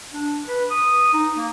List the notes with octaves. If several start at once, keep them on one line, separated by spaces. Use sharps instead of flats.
D4
B4
D#6
D#4
A#3